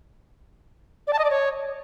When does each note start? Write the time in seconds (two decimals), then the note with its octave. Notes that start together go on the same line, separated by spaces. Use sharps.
1.07 D5
1.13 A5
1.19 D#5
1.24 D5
1.30 C#5